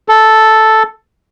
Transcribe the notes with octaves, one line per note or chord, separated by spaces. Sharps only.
A4